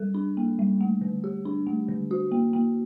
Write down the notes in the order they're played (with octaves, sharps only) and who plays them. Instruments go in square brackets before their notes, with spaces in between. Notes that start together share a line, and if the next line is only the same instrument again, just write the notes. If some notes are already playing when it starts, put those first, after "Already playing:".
Already playing: [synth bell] G3 A4
D4
A#3
G3
A3
D3
G4
D4
A3
D3
F#4
A#3
A#3